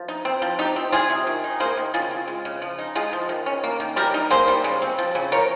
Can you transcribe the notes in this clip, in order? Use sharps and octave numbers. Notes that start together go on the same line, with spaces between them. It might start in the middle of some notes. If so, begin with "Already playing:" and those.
Already playing: F3
D#4
C4
F3
D#4 G4
C4
G3 F4 G#4
C3
D#3
D#4
A#3 G#4 C5
D#3
C#3 F4 G#4
C4
G#3
C#3
F3
D#4
G#3 F4 G#4
F3
D#3
C#4
A#3
D#3
G3 G4 A#4
D#4
A#3 G#4 C5
G3
C#3
C4
F3
C#3
F3 A#4 C#5